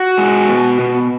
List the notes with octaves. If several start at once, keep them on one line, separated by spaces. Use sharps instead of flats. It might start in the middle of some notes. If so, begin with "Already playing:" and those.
Already playing: F#4
G#3
B2
B2